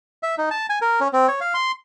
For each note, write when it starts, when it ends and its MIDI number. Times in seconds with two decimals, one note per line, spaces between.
0.23 0.35 76
0.38 0.49 63
0.51 0.66 81
0.69 0.79 80
0.82 1.00 70
1.00 1.08 61
1.13 1.27 60
1.28 1.40 73
1.41 1.54 77
1.54 1.72 84